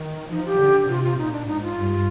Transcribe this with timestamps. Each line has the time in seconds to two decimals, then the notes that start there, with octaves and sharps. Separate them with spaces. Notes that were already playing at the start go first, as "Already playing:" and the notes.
Already playing: D#3
0.31 F3 D#4
0.46 G4
0.60 D3
0.89 C3 F4
1.04 F4
1.19 A#2 D#4
1.32 D4
1.47 G#2 D#4
1.63 F4
1.77 G2